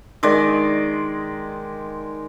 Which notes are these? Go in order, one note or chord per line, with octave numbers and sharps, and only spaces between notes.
D#3 G#3 D5